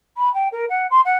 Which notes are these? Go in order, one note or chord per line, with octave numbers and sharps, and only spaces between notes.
B5
G5
A#4
F#5
C6
F#5